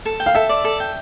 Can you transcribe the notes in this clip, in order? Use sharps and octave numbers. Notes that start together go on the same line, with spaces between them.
A4
G5
F5
A4 E5
D5
A4
G5